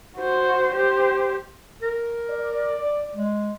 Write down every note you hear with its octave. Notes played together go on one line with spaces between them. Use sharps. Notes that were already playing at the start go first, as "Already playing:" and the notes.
F#4 C5
G4 C5
A#4
D5
G#3